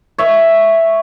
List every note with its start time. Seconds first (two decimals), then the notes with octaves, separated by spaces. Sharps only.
0.18 C#5 E5